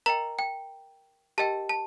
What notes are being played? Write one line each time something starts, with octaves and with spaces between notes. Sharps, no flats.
A#4 D#5 G5 A#5
G5
G4 A#4 D#5 G5 A5
A5